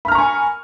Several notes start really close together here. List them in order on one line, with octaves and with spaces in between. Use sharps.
B5 F6 A#5 C#6 G#5